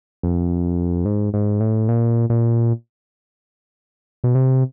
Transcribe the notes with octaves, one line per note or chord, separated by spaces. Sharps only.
F2
G#2
G#2
A2
A#2
A#2
B2
C3